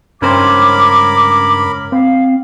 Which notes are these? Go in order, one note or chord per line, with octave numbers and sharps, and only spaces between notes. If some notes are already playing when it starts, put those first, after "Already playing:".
C#2 G2 C#4 A#4 C5 B5 D6
C4 F5